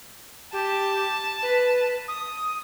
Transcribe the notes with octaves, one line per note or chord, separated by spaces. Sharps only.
G4 A5
B4
D#6